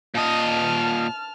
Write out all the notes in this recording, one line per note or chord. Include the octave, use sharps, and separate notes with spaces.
A#2 D#5 A5 F6